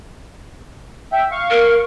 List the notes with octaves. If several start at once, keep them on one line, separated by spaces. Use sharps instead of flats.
E5 G5
F5 C#6
A#4